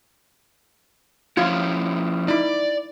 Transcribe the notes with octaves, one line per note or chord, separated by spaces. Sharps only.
F3 C#4 E4 F4
D#4 E4 D5